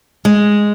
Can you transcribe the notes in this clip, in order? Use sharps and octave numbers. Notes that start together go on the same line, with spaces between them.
G#3